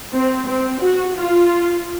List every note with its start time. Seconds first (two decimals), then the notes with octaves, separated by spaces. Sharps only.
0.12 C4
0.47 C4
0.81 F#4
1.16 F4